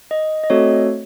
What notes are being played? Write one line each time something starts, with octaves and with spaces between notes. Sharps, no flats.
D#5
D#5
A3 C4 F#4 A4 C#5